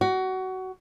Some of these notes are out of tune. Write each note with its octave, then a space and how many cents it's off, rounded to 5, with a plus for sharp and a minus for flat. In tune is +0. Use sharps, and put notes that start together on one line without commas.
F#4 +20